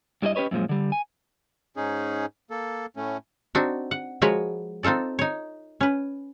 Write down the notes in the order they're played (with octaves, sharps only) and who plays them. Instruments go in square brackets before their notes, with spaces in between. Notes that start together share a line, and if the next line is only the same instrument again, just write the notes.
[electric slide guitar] G2 G3 E4 G4 D#5
C#4 G4 B4 C#5 D#5
F#2 A#2 F3 G#3
D3 G3
G#5
[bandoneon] G#2 C#4 D#4 G#4
A#3 A4
A2 A3 C#4
[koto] C4 D4 D#4 F#4
F#5
F3 G#3 F#4 A#4 B4 C#5
C4 D#4 F4 A4 D5
D#4 C#5
C#4 B4